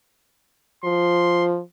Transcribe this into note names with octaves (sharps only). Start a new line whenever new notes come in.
F3 C6